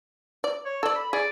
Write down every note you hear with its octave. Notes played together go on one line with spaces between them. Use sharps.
D5
C#5
A4 D5 E6
B5
G#4 D5